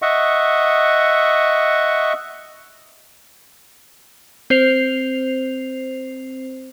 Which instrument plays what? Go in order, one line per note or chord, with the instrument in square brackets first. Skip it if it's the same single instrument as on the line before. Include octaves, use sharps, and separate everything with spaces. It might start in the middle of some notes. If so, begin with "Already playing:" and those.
[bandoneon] D#5 E5 F#5 C#6
[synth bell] C4 C5 C7 F7